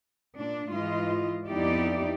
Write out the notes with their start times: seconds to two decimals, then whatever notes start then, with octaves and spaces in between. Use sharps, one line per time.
0.35 A#2 D4
0.71 G#2 E3 G#3 F4 D#5
1.47 F2 B3 D#4 E4 G4 D5